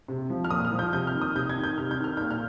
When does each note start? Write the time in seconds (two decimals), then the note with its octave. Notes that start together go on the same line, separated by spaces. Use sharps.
0.08 C3
0.30 F3
0.44 F6
0.50 A#2 D#6
0.65 F6
0.72 F3
0.79 G6
0.93 C3 G6
1.07 F6
1.14 D#3
1.21 D#6
1.35 C3 G6
1.49 G#6
1.56 D#3
1.63 G6
1.78 C3 F6
1.91 G6
1.99 D#3
2.04 F6
2.17 A#2 G6
2.31 F6